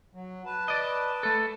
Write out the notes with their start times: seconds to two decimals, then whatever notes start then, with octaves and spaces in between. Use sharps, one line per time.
0.14 F#3
0.46 B4 A5
0.68 D5 D#5
1.23 A3 A4